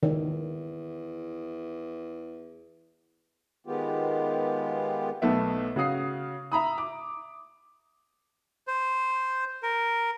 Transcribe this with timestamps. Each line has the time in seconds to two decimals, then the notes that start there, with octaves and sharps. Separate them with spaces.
0.03 E2 D#3
3.67 D#3 G#3 B3 F4 G4
5.22 B1 A3 B3 E5
5.76 C#3 F#4 F5 D#6 C7
6.52 E5 A#5 B5 D#6
6.78 D6
8.67 C5
9.63 A#4